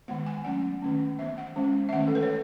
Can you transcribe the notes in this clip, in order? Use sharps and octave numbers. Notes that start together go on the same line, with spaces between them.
D#3 G#3 B3 F#5
G#5
F#3 A3 C#4 F#5
D#3 A3 C#4
E3 B3 E5
F#5
E3 G#3 C#4
E5
D#3 A3 C#4 F#5
A4
B4
C#5